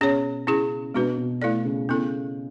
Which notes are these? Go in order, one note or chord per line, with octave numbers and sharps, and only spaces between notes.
B2 C#4 G#4 C#5
C#3 C#4 E4 G#4
B2 G#3 D4 F#4 B4
B2
A3 E4 A4 D5
C#3
C#3 B3 E4 A4